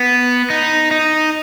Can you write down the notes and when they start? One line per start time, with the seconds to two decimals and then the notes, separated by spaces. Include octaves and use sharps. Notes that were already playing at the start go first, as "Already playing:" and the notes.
Already playing: B3
0.50 D#4
0.91 D#4